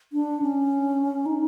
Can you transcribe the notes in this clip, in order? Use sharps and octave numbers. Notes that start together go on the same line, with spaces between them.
D4
C#4
D#4